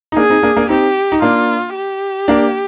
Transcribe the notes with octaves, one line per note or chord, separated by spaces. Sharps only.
D#4
A#3 D4 G#4
C4 D#4
A#3 D4
A#3 D4
C4 D#4 G4
D#4
A#3 D4 F4
G4
A#3 D4